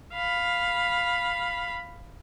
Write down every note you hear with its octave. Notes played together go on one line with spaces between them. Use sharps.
F5 B5